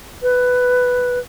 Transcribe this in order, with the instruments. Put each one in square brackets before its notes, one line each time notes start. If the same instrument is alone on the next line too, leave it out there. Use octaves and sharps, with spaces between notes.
[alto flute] B4